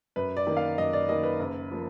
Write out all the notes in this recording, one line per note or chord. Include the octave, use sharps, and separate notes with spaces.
F#2 B4
D5
D#3 A#3
F5
F#2 D#5
D5
D#3 A#3 D#5
B4
F#1
F3 A#3